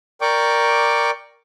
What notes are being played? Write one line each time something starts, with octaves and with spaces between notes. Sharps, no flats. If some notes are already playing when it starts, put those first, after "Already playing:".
A#4 D5 G5 C#6 D6